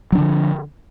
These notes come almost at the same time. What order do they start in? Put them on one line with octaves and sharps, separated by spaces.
F#3 D4 D3 F3